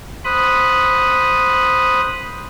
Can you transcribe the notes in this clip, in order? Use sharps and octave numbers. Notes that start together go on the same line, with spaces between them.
C5 B5 D#6 F#6